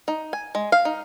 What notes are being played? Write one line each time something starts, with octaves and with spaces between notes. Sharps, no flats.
D#4
G#5
G#3
F5
D#4